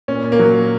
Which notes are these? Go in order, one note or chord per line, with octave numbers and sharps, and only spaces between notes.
A#2 C#4
A#2
A#3
F#3